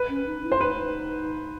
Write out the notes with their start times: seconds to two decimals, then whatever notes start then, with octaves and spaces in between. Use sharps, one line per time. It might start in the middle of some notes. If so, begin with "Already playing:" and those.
Already playing: B4
0.09 C#4
0.26 D#4
0.44 E4
0.52 C5
0.61 D#4 B4